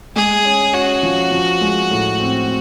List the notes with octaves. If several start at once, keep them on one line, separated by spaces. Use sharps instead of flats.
G#3 G#4
C#4
C#4 F#4
F3
F3
G#3
A2
C4